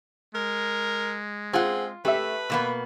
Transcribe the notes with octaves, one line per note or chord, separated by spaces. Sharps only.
G#3 A#4
C4 F4 G#4 F#5
A3 G4 B4 E5
B2 A#3 B3